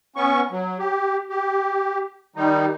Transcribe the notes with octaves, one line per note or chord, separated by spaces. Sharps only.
B3 C#4 C#6
F#3
G4
G4
D#3 G3 D#4